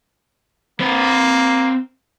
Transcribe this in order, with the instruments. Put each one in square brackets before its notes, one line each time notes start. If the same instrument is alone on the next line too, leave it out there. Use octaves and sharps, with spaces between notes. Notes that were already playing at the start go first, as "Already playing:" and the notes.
[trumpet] A#3 [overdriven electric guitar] C4 B4